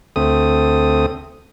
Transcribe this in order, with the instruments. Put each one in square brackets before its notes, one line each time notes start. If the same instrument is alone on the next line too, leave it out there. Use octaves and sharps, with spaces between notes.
[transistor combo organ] D2 A3 C4 D#6